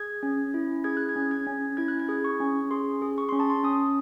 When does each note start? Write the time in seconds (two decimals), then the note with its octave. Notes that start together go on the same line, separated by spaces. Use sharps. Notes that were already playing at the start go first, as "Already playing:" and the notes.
Already playing: G#4 G#6
0.23 C#4
0.54 E4
0.84 G#4 G#6
0.97 F#6
1.09 G#6
1.16 C#4
1.31 G#6
1.47 C#4
1.77 E4 G#6
1.88 F#6
2.00 G#6
2.09 G#4
2.24 C#6
2.40 C#4
2.71 G#4 C6
3.02 G#4
3.18 C#6
3.29 C#4 C6
3.40 A5
3.50 C6
3.63 C#4 D#6